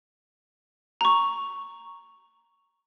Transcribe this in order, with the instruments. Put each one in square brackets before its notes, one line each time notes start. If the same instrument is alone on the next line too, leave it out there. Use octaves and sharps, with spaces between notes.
[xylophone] A#5 C#6